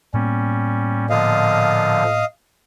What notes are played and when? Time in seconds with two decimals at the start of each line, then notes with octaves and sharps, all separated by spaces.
0.14 A2 G3 A#3 B3 C#4
1.10 A#2 D3 F3 D#5 F5